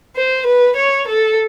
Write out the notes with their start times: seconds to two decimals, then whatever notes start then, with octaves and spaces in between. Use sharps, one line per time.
0.16 C5
0.46 B4
0.77 C#5
1.08 A4